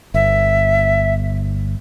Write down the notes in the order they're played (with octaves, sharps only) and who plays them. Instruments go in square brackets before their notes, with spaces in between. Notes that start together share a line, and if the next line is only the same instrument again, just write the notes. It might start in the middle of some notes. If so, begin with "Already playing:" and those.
[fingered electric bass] G1 [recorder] E5